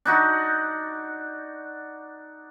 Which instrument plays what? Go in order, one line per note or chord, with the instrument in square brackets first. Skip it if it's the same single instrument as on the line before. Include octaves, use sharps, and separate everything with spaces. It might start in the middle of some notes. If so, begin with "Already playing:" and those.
[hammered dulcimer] D4 D#4 F#4